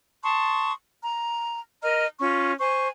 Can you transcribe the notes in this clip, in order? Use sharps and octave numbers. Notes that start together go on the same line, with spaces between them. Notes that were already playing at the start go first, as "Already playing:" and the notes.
A5 C6 C#6 D#6
A#5
A#4 D#5 A#5 F6
C#4 F4 C#6
C5 G#5 C#6